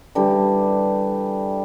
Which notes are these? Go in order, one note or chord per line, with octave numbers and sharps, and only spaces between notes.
D3 E3 G3